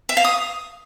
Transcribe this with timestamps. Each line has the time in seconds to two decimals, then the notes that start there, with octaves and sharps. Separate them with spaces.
0.09 E5
0.17 F5
0.24 D#6